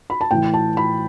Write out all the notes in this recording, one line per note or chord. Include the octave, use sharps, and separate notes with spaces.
B5
A5
A2 E3 G5
A5
B5